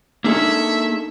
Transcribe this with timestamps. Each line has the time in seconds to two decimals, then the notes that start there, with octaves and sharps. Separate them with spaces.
0.24 A#3 D4 D#4 G#4 A4 E5